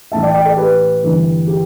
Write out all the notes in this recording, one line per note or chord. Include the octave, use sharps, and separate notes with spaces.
A1 A2 A3 E5 A5
D5 G5
D5 G5
A4 D5
G4 B4
G1 G2 E3 A3
G4